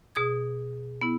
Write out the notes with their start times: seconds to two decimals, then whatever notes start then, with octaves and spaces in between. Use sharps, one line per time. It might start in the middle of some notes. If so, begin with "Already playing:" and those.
0.15 B2 G#4 D#6 G#6
1.01 B3 E4